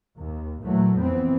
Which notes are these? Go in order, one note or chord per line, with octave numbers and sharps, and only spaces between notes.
D#2
A#2 E3 F#3 A3
F2 E3 B3 C4